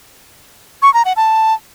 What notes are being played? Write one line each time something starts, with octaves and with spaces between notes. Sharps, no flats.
C#6
A#5
F#5
A5